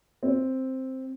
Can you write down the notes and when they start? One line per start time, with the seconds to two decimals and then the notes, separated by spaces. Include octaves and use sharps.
0.23 C4